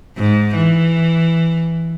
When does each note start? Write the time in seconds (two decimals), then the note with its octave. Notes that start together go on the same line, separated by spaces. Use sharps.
0.17 G#2
0.56 E3